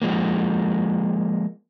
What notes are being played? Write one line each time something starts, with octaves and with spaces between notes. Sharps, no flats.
F3 G#3 A#3